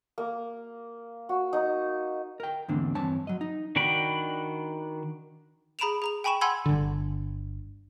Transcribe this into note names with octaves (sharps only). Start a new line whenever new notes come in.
A#3
F#4
D#4
A#4 G5
E2 G#2 D3 A#3 C4 D4
G2 E3 C4 C#5 A5
F#3 D#5
D#4
D#3 D4 F#4 G5 B5
G#4 A#5 B5 D7 E7 F7
G#4 A#5 F7
G5 G#5 B5 C#6 E7
F#5 G#5 B5 C6 E6 G#6
G1 D3